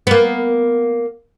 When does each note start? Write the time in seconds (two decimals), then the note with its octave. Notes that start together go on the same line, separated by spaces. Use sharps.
0.07 A#3 B3